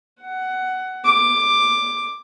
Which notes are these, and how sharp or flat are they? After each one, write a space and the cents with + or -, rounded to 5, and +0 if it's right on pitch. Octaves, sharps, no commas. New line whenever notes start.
F#5 +15
D6 +10